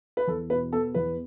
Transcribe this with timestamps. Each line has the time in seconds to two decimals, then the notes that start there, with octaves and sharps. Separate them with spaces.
0.17 B4
0.27 E2 A4
0.50 B2 B4
0.72 B3 A4
0.94 E2 B4